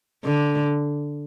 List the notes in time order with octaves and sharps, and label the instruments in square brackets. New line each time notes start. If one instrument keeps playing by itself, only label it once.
[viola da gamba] D3